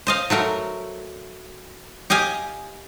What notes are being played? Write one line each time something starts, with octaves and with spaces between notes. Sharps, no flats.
C5 D#5 F5
F#3 A3 F#4 A#4
G4 D#5 F5 G#5